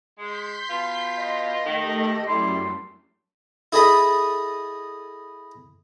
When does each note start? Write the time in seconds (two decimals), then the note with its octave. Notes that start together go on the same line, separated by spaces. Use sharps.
0.19 G#3 C6 G6 B6
0.70 B2 F4
1.17 D#5
1.66 D#3 A3 G4 A4
2.28 F#2 G3 E4 C6
3.72 E4 G#4 A4 D#5 B5